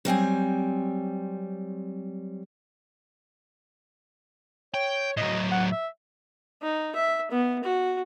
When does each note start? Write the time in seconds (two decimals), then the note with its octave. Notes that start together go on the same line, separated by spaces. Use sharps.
0.05 F#3 G3 C4 G#5
4.74 C#5 G5
5.17 A2 F#3 D#5
5.51 F#5
5.72 E5
6.62 D#4
6.95 E5
7.31 B3
7.63 F#4